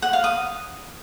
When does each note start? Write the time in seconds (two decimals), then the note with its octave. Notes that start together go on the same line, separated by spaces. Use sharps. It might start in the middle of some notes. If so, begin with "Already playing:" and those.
0.02 F#5
0.13 F5
0.24 D#6